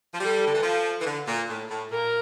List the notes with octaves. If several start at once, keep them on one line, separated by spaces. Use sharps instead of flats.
F3
G3 A4
D3
E3
F3
E3
D3
A#2
A2
A2
A#2 A#4